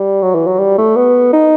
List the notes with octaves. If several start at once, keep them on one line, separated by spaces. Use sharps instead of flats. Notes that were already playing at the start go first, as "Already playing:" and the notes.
Already playing: G3
F#3
E3
F#3
G3
A3
B3
D#4